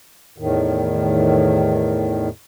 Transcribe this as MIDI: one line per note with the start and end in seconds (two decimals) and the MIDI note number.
0.38 2.29 40
0.38 2.29 45
0.38 2.29 51